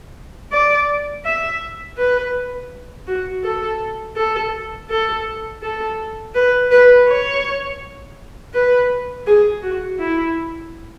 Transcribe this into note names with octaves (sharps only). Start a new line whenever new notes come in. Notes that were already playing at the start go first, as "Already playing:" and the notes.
D5
E5
B4
F#4
A4
A4
A4
A4
B4
B4
C#5
B4
G#4
F#4
E4